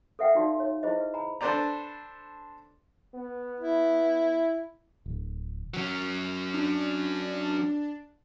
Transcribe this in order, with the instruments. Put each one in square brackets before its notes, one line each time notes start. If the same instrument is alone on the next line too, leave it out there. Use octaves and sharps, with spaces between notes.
[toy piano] A4 B4 E5 F#5 G5
D#4 F4 F#4 D5 F5 C6
C#5
E4 F4 G#4 C5 D#5
B4
G#5 A#5 B5
[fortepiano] D4 A4 B4 C5 D5 A#5
[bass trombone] B3
[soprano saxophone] E4
[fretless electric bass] D1
[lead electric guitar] F#3 C#4
[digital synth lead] D4